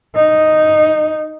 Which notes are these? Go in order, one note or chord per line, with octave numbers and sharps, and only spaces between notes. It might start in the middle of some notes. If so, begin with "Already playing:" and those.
D#4